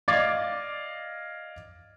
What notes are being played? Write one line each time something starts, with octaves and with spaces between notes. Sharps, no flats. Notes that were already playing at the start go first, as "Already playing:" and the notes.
D5 D#5 F5 D6 G#6 A6